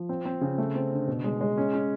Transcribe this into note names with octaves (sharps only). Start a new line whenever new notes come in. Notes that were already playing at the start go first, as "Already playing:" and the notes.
Already playing: F3
C4
C4
C#3
A3
C4
D3
B2
G#3
G#3
C#4
C#4